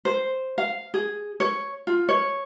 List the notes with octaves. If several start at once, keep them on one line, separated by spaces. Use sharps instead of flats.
C5
F5
G#4
C#5
F4
C#5